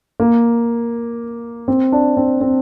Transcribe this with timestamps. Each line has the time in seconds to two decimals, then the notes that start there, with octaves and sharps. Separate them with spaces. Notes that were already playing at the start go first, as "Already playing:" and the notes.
0.20 A#3
1.68 C4
1.92 D4
2.17 C4
2.41 C4